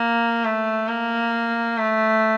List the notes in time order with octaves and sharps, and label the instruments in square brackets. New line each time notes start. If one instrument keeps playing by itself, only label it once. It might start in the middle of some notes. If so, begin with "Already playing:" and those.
Already playing: [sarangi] A#3
A3
A#3
A3